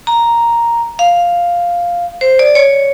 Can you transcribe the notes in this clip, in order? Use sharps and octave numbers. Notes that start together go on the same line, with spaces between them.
A#5
F5
C5
D5
C#5